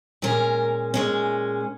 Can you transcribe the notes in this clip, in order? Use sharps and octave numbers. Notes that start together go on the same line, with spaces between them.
A#2 G#3 C#4 A#4
A#2 G#3 C#4